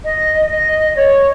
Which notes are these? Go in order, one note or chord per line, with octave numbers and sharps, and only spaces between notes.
D#5
D#5
C#5